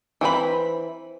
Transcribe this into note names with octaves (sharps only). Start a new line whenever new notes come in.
E3 C4 F#4 B5